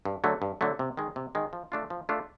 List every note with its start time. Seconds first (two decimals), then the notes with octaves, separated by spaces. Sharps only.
0.05 G2
0.24 D3 F#3 A3
0.42 G2
0.61 D3 F#3 A3
0.79 C3
0.97 D#3 G#3
1.16 C3
1.35 D#3 G#3
1.53 F3
1.72 A3 D4 F4
1.90 F3
2.09 A3 D4 F4